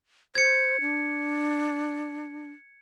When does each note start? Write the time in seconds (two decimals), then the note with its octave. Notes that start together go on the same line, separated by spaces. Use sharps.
0.35 C5 G#6 C#7
0.81 D4